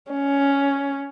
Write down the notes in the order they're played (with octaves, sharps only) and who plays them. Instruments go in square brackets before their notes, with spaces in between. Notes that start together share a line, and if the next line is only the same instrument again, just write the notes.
[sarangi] C#4